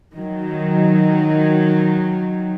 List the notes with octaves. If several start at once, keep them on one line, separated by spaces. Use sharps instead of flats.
D#3 F#3